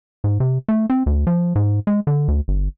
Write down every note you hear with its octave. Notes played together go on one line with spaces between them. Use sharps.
G#2
C3
A3
C4
D2
F3
G#2
G#3
D3
D2
G1